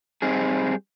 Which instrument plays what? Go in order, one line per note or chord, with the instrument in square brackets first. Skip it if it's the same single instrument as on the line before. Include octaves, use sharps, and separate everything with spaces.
[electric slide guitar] G3 C4 D#4 G#4